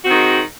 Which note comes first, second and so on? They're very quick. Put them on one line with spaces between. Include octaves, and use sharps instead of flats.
F#4 C4 D#3 G#3